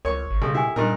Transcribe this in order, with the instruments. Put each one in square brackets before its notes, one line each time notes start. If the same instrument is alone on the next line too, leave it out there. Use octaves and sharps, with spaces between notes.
[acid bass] C#2 [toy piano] A#4 [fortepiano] C#5 C#6
[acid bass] G#1
[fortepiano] C#2 [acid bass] B2 [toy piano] G4 A4 F5
[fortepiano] E4 [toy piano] G4 G5 G#5
[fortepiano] G2 D#4 A#4 [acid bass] A#2